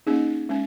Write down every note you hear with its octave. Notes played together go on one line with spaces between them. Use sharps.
A#3 C#4 D#4 G#4
G#3 C#4